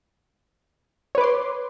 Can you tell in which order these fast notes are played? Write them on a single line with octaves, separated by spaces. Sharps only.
C#5 B4 D6 C6